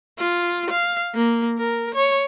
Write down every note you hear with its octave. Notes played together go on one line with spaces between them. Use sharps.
F4
F5
A#3
A#4
C#5